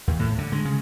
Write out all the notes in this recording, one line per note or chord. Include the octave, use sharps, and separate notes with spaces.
D#2
A2
D3
G#3
C#3